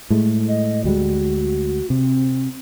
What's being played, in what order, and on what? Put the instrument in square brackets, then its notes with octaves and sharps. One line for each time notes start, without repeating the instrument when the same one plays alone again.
[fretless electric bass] A2 G#3 A3
[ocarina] D#5
[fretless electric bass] D2 G3 G#3 [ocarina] F#4
[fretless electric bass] C3 [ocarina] C4